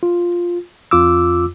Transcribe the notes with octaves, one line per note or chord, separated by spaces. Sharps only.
F4
F2 F4 D6 E6